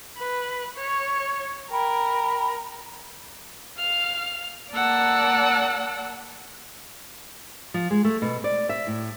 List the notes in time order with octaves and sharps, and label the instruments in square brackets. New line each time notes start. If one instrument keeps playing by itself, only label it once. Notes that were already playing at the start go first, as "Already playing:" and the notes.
[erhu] B4
C#5
[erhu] A#4 [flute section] G5 B5
[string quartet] F5 F6
A#3 D5 F#5 A5 E6
[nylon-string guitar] F3
G#3
A3
B2
D5
E5
A2